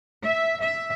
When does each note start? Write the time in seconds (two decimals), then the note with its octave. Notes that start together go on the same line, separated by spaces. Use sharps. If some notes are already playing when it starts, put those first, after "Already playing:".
0.24 E5
0.61 E5